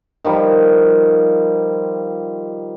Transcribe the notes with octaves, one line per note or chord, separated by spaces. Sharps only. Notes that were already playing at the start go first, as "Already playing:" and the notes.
D#3 F3 G3